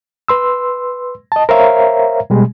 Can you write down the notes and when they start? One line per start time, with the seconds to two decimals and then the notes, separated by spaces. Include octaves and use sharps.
0.28 B4 C6 E6
1.32 D#5 A5
1.49 A#4 C5 C#5 E5 F5 A#5
2.30 B2 G3 G#3